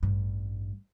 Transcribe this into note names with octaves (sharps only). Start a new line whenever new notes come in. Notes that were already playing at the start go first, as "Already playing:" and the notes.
A1 G2